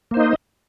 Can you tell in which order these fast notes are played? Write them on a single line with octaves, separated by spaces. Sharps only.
A#3 C5 D#4 D#5